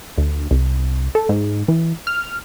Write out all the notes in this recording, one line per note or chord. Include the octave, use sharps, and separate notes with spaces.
D2
C2
A4
G#2
E3
F6